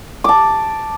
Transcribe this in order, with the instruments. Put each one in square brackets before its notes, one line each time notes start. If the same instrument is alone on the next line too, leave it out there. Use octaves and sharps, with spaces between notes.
[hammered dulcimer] A5 D6